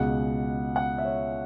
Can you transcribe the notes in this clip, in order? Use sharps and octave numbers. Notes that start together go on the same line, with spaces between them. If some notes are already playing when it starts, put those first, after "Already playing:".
Already playing: C#2 B2 G#3 F#5
F#5
E5
C#5